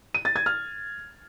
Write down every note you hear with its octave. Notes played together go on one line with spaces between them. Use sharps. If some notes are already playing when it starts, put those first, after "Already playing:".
D#7
A6
G#6
F6